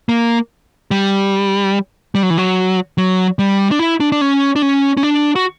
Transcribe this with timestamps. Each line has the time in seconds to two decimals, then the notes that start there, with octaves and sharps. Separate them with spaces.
0.09 A#3
0.91 G3
2.15 G3
2.23 F#3
2.30 E3
2.38 F#3
2.98 F#3
3.39 G3
3.71 D4
3.79 E4
4.00 D4
4.12 D4
4.21 C#4
4.56 D4
4.62 C#4
4.97 C#4
5.03 D4
5.36 F#4